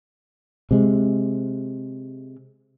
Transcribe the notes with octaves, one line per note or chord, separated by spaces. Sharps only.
C3 G#3